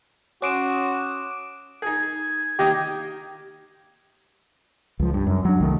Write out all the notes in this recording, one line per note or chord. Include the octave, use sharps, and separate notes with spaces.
C#4 F#4 C6 D6 D#6 D7 E7
D#4 G#4 G#6
D#3 A#3 G4 D#5
C#2 F3
G2
F#2
F#3 D4
C2 D#3 A3